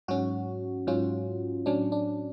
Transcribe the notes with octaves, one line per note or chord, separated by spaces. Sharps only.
G#2 F#3 C#4 F#4
G#2 F#3 C#4 F4
A2 F#3 C#4 D4
D4